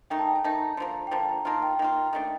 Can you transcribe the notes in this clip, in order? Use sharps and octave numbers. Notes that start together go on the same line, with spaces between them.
D#3 A3 D#4 G5
A5
G5
A5
D#3 A3 D#4
D3 F3 A#3
G5
D3 F3 A#3 A5
A#5
D#3 A#3 F4 A5
G5
D#3 A#3 F4
D#3 A3 D4